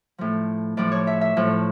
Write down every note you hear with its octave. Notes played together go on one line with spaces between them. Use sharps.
A2 F3
A2 F3 D5
C#5
E5
E5
A2 F3